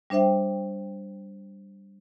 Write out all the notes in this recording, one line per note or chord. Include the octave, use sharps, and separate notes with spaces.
G3 D4 C5 E5 G5